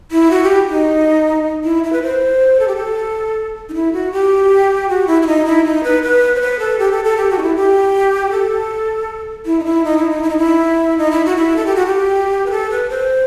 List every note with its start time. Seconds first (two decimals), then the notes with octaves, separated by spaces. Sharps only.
0.11 E4
0.31 F#4
0.43 G4
0.69 D#4
1.64 E4
1.84 E4
1.93 B4
2.02 C5
2.60 A4
2.68 G4
2.76 A4
3.69 D#4
3.74 E4
3.93 F#4
4.12 G4
4.89 F#4
5.07 E4
5.22 E4
5.27 D#4
5.46 E4
5.65 D#4
5.84 B4
6.03 B4
6.35 C5
6.41 B4
6.59 A4
6.79 G4
6.91 A4
7.05 A4
7.17 G4
7.31 F#4
7.38 D#4
7.42 E4
7.56 G4
8.31 A4
9.46 E4
9.60 D#4
9.65 E4
9.84 D#4
9.97 E4
10.10 D#4
10.23 E4
10.30 D#4
10.38 E4
10.98 D#4
11.11 E4
11.26 F#4
11.37 E4
11.56 A4
11.66 G4
11.76 F#4
11.86 G4
12.46 B4
12.51 A4
12.70 B4
12.90 C5